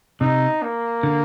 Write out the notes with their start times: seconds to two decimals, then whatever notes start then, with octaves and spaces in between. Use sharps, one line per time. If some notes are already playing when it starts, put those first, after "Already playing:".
0.21 C3 D#4
0.62 A#3
1.03 D3